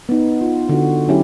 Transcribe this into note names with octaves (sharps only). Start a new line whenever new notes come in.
B3 D#4
F4
D3 F#4
F#3 C#4 E4 G4